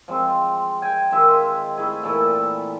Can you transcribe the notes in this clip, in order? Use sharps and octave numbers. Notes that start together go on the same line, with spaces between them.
F3 G#3 C4
G5 G#5
D#3 G#3 F4 E5
A3 E4 G#4
A#2 E3 A3 A4